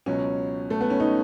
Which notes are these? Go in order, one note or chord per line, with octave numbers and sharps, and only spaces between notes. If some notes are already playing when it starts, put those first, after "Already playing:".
C#2 B2 F#3 C#4
A3
B3
C#4
D#4